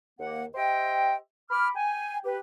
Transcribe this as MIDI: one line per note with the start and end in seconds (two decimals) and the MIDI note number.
0.20 0.44 39
0.20 0.44 58
0.20 0.44 78
0.55 1.14 67
0.55 1.14 72
0.55 1.14 75
0.55 1.14 76
0.55 1.14 79
1.50 1.69 83
1.50 1.69 86
1.50 1.69 89
1.75 2.18 79
1.75 2.18 80
2.25 2.38 67
2.25 2.38 71